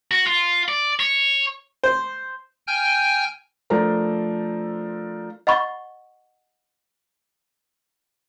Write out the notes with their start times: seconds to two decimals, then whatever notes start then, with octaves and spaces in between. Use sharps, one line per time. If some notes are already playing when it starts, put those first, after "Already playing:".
0.11 F#4
0.27 F4
0.68 D5
1.00 C#5
1.84 C5
2.67 G5 G#5 F6 G6
3.70 F3 A3 D4 A4 A#4 C5
5.47 D#5 F#5 B5 C#6